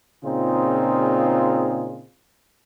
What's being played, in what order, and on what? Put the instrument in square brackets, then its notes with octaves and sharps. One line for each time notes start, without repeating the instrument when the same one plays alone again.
[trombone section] A#2 C#3 C4 D#4 F4 G#4